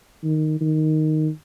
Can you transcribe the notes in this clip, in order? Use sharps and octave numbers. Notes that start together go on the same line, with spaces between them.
D#3
D#3